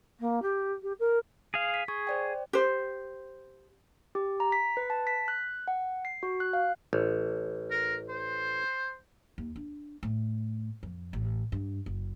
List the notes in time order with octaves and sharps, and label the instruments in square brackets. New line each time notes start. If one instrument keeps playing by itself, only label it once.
[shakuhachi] A#3
G4
G4
A#4
[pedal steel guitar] G#4 F5
[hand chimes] B6
[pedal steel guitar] G#4 [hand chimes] C#6
[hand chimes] C5 D5 G5
[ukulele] G4 C5
[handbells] G4
A#5
B6
B4
A5
B6
F#6
F#5
C7
F#4
F#6
F5
[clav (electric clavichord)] A1
[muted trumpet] A#4
C5
[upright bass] D#2
D4
A2
F2
A1
G2
F#1